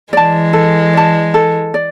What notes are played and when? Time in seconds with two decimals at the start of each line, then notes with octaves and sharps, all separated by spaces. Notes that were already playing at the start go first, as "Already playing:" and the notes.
0.13 E3 G#3 D5 A5
0.53 A4
0.93 D5 A5
1.34 A4
1.74 D5